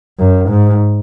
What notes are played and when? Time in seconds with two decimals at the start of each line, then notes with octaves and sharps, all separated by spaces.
0.19 F#2
0.49 G#2